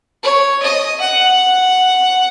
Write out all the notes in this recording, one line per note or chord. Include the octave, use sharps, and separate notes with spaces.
C#5
D#5
F#5